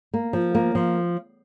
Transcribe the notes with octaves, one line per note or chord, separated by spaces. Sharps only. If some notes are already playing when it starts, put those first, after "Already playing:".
A#3
F3
A#3
F3